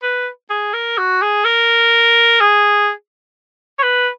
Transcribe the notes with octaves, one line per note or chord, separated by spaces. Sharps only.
B4
G#4
A#4
F#4
G#4
A#4
G#4
C#5
B4